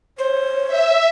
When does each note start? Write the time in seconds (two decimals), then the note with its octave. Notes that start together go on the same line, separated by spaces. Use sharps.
0.18 C5 C#5
0.67 E5